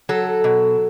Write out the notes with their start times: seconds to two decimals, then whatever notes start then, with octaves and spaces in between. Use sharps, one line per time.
0.09 F#3 A4
0.44 B2